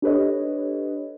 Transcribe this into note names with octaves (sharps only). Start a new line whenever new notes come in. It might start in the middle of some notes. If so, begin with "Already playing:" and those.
D4 G4 A4 B4 C#5 D#5